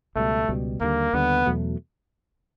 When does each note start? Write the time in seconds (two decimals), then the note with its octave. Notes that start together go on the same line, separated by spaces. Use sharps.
0.16 C#2 B2 G3 A3
0.48 C#2 B2 G3
0.81 D#2 D3 G3 A#3
1.13 D#2 D3 G3 B3
1.46 E2 B2 F#3 A3